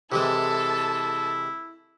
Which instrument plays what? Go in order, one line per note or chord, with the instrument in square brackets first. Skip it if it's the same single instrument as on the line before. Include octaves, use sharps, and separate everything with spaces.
[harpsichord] C3 E3 G#3 [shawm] E4 [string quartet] A4 A5